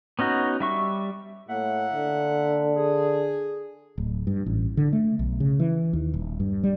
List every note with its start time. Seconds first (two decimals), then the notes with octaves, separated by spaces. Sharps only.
0.19 B3 C#4 D#4 F#4
0.60 G3 E5 C#6
1.49 A2 A#3 E5 F#5
1.93 D3
2.76 G#4
3.98 D1
4.27 G2
4.46 A1
4.77 D3
4.93 A3
5.19 B1
5.40 C#3
5.60 E3
5.93 D#2
6.14 D#1
6.40 G2
6.63 G3